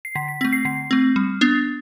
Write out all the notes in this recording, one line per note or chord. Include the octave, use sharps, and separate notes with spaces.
C7
D3 B6
B6
A3 C4 B6
C7
D3 C7
A3 C4
G3
B3 D4